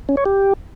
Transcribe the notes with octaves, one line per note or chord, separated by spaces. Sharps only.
C#4
C#5
G4